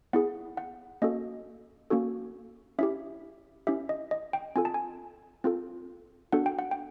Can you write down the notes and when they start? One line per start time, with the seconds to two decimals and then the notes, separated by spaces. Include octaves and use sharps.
0.13 B3 E4 G#4 F#5
0.57 F#5
1.02 A#3 C#4 F#4 A4 D#5
1.90 A#3 C#4 F#4 A4
2.79 C#4 E4 G4 E5
3.67 C#4 E4 G4 E5
3.89 D#5
4.11 D#5
4.33 G5
4.56 C4 F4 A4 G#5
4.65 A5
4.74 G#5
5.44 C4 F4 A4
6.32 B3 D4 F#4 A4 F#5
6.46 G5
6.59 F#5
6.71 G5